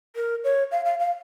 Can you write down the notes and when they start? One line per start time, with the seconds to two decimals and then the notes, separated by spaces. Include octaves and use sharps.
0.16 A#4
0.44 C#5
0.72 F5
0.85 F5
0.99 F5